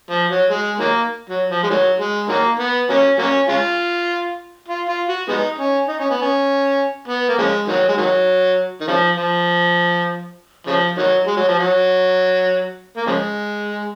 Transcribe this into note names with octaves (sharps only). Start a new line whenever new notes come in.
F3
F#3
G#3
D#3 F#3 A#3
F#3
F3
G#3
D#3 F#3
G#3
D#3 F#3 A#3
B3
F#3 A#3 C#4
F#3 A#3 C#4
G#3 C#4 F4
F4
F4
F#4
G#3 B3 D#4
C#4
D#4
C#4
B3
C#4
B3
A#3
C#3 F3 G#3
D#3 F#3
G#3
D#3 F#3
D#3
C#3 F3
F3
C#3 F3
D#3 F#3
G#3
F#3
F3
F#3
A#3
C#3 F3 G#3